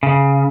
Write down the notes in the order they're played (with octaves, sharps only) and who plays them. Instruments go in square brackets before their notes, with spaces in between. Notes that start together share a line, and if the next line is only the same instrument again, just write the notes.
[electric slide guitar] C#3